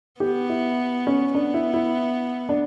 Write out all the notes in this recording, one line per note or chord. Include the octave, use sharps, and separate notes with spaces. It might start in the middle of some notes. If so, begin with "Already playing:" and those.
B3 G4
E4
C#4
B3 D4
E4
E4
D4